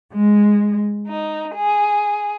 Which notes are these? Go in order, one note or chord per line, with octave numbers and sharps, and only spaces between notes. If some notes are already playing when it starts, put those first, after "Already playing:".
G#3
D#4
G#4